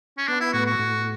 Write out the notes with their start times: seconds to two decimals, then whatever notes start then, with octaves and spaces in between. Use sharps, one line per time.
0.18 C#4
0.27 B3 D4
0.40 E4
0.53 A2 F#4
0.66 F#4
0.79 A2